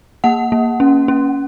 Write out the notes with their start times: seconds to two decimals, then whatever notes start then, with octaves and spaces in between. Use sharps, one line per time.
0.24 A#3 F#5
0.52 A#3
0.80 C#4
1.08 C#4